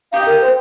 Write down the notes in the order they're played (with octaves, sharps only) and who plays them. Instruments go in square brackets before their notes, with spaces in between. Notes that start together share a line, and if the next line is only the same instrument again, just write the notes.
[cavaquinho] D#4 G4 D#5 G5 [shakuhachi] F5
[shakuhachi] A#4
C5